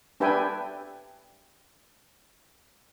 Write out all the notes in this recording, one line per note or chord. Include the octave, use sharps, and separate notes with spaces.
D4 G4 B4 E5 G5 G#5